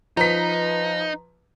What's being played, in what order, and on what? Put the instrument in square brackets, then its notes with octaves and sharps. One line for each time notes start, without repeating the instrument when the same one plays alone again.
[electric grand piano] F3 B4 [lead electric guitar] D#4 [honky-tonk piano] A#5 B6